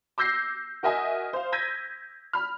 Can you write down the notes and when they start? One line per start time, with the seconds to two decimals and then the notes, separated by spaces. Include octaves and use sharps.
0.18 D6 E6 G6 A#6 C7
0.83 F#4 A#4 D#5 E5 G#5 D#6
1.33 C5 F5
1.52 E6 G6 G#6 A#6 B6 D#7
2.33 B5 F6